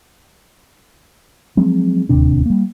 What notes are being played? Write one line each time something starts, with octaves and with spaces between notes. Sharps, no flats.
F3 F#3 G#3 C4
D1 D#2 C3 D4
G3 A#3